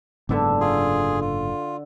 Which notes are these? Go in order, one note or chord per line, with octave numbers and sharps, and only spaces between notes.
F#1 G#2 D3 B3 E5 D6
F4 G#4
F4